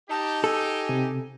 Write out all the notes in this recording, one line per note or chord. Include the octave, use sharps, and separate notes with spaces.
D#4 G4 A5
A4 G#5
C3